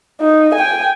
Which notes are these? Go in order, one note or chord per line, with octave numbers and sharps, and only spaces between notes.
D#4
G5 G#5